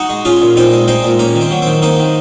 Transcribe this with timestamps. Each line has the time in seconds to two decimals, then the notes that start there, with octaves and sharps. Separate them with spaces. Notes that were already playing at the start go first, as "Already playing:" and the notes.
Already playing: D#4 F#4
0.09 G#3
0.25 G#3 C#4 F4
0.41 A#2
0.56 A#2 C4 D#4
0.73 G#3
0.88 G#3 C4 D#4
1.04 A#2
1.19 A#3 C#4
1.35 D#3
1.41 C4
1.51 F#3
1.62 D#3 C4
1.82 A#3 C4 D#4
1.99 D#3